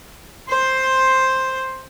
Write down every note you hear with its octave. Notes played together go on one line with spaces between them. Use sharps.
C5 C6